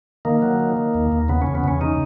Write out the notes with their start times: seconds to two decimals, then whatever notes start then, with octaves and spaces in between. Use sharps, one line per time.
0.25 D#3 A#3
0.42 F#3
0.60 D#3
0.77 D#3
0.94 D#2
1.12 D#2
1.28 C#3 B3
1.42 E2 C#4
1.55 B3
1.64 E2 C#4
1.81 C#3 D#4